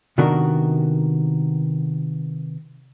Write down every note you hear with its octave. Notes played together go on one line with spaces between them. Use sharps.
C3 D#3 B3 D4 F#4 A#4